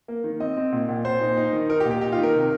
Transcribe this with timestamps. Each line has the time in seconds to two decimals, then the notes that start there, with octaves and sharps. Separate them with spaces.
0.08 A#3
0.24 D#3
0.40 C4 D#5
0.57 C4
0.72 A#2
0.89 A#2
1.05 A#2 C5
1.21 D#4
1.37 D#4
1.53 D#3
1.69 D#4 A#4
1.80 G4
1.85 A#2
1.91 G4
2.01 D#4 G4
2.12 F4
2.18 D#3
2.23 A#4
2.34 C3